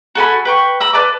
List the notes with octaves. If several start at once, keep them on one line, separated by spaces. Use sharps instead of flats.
F#4 A4 G#5 B5
B4 G5 C#6
A#5 B5 E6
B4 D5 A5 D6